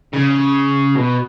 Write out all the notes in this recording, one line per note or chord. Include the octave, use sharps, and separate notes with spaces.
C#3
B2